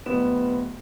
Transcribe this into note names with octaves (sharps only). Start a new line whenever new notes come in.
D1 B3 E7